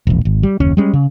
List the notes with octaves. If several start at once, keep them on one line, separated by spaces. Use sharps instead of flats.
E1 A#1
G#1
G3
F#1 D#2 C#4
G3 G#3 C#4
C#3